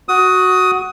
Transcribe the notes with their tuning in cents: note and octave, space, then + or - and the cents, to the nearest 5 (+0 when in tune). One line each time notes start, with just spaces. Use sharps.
F#4 +0 D#6 +20